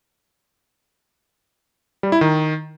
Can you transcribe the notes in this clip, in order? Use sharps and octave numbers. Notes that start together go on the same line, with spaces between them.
G3
E4
D#3